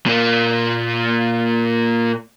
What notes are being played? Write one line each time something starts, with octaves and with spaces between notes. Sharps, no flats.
A#2 A#3